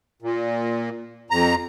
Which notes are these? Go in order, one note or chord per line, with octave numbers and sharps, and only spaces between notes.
A#2
F2 A#5